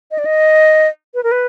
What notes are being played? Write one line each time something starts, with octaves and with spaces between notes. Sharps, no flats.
D#5
D5
D#5
B4
A#4
B4